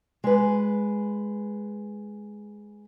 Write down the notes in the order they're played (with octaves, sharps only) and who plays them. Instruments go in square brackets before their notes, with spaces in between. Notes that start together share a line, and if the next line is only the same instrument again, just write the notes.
[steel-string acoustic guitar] G#3 B4